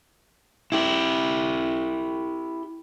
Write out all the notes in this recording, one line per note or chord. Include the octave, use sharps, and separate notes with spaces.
E4 G4